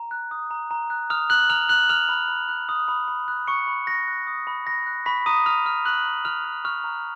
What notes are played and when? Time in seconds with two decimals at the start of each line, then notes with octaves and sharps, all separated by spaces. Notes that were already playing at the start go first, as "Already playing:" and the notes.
Already playing: A#5
0.11 F#6
0.31 D#6
0.51 A#5
0.71 A#5
0.90 F#6
1.10 D#6 F6 F7
1.30 A#5 F#6 F#7
1.50 A#5 F6 F7
1.69 F#6 F#7
1.89 D#6 F6 F7
2.09 B5
2.29 B5
2.49 F#6
2.69 D#6
2.88 B5
3.08 B5
3.28 F#6
3.47 C#6 D#6 C#7
3.68 B5
3.87 B5 A#6
4.07 F#6
4.27 D#6
4.47 B5
4.67 B5 A#6
4.86 F#6
5.06 B5 C#6 B6
5.26 A#5 D#6 D#7
5.46 A#5 F6 F7
5.66 F6 F7
5.85 C#6 F#6 F#7
6.06 A#5
6.25 A#5 F6 F7
6.45 F6
6.64 C#6 F6 F7
6.84 A#5